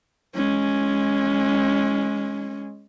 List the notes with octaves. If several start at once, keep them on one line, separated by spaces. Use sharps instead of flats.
G#3 C#4